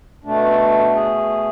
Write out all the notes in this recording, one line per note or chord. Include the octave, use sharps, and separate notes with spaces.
B2 A3 D4
G#4